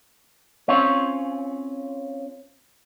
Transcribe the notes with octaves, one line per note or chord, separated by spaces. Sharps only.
C4 C#4 F4 C#5